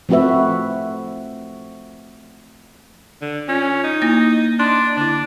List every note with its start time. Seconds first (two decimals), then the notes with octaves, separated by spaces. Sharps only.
0.09 F3 A3 C4 F#4 B4 E5
3.22 D3
3.49 C#4 F4
3.84 D#4
4.02 A#3 E4 A#6
4.60 D4 C6
4.97 D3 D4 E4